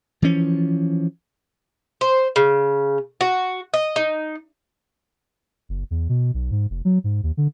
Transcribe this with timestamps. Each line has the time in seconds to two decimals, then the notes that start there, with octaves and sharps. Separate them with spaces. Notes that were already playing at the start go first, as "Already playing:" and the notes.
0.22 E3 F3 C#4
2.01 C5
2.36 C#3
3.21 F#4
3.74 D#5
3.96 D#4
5.69 F#1
5.91 E2
6.09 B2
6.34 B1
6.51 G#2
6.70 F1
6.85 F#3
7.04 G#2
7.23 D#2
7.37 D3